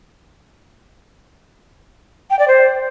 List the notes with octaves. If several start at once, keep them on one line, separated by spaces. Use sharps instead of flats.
G5
D5
C5